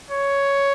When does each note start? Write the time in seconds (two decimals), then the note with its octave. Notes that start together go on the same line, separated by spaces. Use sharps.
0.10 C#5